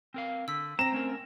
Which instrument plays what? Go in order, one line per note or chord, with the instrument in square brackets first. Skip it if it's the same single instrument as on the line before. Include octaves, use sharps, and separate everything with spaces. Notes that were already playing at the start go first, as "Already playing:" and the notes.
[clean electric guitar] C4 A#4 F5
[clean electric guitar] D3 [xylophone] E6 B6
[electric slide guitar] C4 [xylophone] G5 A#6 [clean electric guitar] A#5 [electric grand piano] E7
[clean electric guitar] A3 C#4 A#4